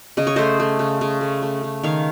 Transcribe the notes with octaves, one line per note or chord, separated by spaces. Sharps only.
C#3 D#5
C#5
A3 C5 D#5
A3
C#3
C#3
A3
A3
C#3
D#3 C#5 F5